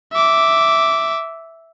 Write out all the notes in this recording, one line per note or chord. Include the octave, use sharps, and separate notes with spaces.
E5 D6